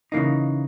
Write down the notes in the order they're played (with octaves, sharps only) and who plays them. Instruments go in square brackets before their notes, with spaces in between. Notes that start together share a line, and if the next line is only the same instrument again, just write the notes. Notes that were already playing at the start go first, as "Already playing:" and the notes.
[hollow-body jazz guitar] C#3 E3 A#3 D#4